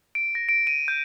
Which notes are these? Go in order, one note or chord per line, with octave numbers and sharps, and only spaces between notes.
D7
A#6
D7
D#7
G6